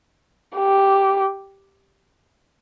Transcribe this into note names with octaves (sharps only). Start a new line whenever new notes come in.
G4